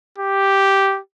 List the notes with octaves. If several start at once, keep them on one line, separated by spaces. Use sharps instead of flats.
G4